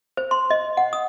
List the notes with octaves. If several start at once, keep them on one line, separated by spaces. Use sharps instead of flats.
C5
C6
D#5
F#5
D#6